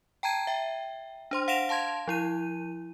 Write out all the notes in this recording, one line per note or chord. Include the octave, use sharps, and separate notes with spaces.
G5 A5 A#5 G#6 D#7
E5 G5
D4 C5 C6
F5 F#5 A#6 D7 E7 F7
F5 A5 C6 G#6
F3 E4 D#7